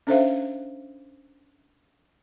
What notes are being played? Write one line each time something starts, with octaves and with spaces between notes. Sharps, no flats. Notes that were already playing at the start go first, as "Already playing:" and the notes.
C#4 D4 A4 C5 E5 F5